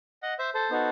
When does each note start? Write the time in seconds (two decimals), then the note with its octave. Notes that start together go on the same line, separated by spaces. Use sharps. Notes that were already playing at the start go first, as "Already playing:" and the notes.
0.23 D#5 F#5
0.39 C5 E5
0.54 A4 C5
0.70 B3 D#4 F#4 A4